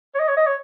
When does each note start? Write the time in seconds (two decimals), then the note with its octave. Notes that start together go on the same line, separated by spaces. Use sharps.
0.15 C#5
0.19 D#5
0.28 C#5
0.37 D#5
0.47 C#5